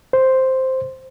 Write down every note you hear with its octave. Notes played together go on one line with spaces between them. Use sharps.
C5